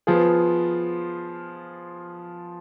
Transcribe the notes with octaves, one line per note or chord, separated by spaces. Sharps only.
F3 B3 F4 G#4